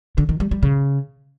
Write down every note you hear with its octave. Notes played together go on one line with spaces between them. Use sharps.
D3
D#3
G3
G3
C#3